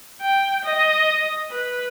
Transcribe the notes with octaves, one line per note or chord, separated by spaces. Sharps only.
G5
D#5
B4